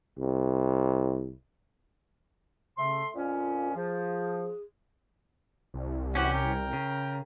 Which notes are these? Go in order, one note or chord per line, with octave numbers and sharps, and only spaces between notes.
C2
C#3 A3 C6
F2 A#2 C#4 F4
F3 G#4
C2
E3 C#4 F#4 G4 F#5
A#4 G5
C#3